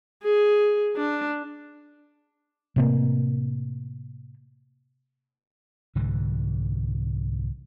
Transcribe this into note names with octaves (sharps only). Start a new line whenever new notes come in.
G#4
D4
A2 C3 A#3
C2 G#2 D3 E3